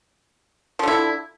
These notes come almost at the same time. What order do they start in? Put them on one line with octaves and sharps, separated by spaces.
F3 D3 E4